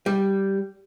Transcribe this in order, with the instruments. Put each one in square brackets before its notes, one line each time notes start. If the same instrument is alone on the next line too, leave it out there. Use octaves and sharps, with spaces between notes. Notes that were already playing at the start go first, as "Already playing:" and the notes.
[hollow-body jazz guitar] G3